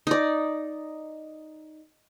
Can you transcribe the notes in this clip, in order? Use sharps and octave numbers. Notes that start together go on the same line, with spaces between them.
D#4 D5